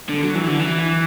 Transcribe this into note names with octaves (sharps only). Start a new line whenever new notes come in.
D3
F#3
E3
D3
E3